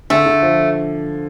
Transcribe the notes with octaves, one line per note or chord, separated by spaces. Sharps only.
D3 A3
D3
F3